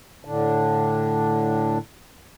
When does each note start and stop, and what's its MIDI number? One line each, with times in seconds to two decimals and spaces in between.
0.25 1.78 45
0.25 1.78 50
0.25 1.78 62